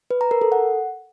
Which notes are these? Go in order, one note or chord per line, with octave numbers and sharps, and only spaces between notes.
B4
A#5
A#4
A4
F#5